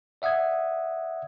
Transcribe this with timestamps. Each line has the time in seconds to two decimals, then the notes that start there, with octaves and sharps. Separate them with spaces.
0.22 D5 E5 F#5 D#6 G#6